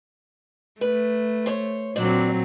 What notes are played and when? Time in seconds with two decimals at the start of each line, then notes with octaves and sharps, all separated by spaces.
0.81 A3 B4
1.46 C5 C#5
1.96 A#2 F#3 C4 D4 C5 D5